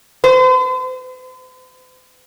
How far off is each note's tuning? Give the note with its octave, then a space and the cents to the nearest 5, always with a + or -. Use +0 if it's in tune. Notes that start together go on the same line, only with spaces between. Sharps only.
C5 -45